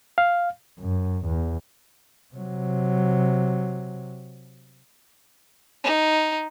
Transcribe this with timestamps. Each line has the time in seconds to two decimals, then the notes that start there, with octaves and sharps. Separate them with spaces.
0.18 F5
0.80 F#2
1.26 E2
2.34 C3 F#3
5.84 D#4